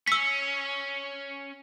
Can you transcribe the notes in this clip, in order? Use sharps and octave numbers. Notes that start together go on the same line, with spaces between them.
C#4 E6 B6